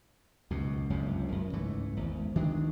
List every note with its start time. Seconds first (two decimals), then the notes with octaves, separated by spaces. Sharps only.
0.50 C#2 F#2 B2
0.90 F#1 C#2 G2 C3
1.32 F#2
1.53 C#2 G#2 E3 A3
1.97 G#1 E2
2.35 D2 D#3 G#3 D4